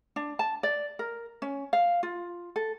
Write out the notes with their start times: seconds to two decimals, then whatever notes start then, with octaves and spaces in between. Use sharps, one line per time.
0.16 D4
0.39 A5
0.63 D5
0.99 A#4
1.42 C#4
1.73 F5
2.03 F4
2.56 A4